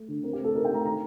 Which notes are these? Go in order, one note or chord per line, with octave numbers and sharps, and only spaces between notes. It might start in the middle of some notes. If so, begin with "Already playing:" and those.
Already playing: A3
D3
C4 A#4
G4
A3
A4
D#4 A#4
G5
A3 A#5
D#3 A#5